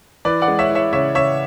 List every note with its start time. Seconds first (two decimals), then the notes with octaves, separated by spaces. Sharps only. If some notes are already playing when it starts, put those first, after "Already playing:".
0.25 E3 B4 D5
0.42 D5 F#5
0.48 G#3
0.59 C#5 E5
0.70 E3
0.75 C#5 E5
0.93 C#3 C#5 E5
1.15 C#3 C#5 E5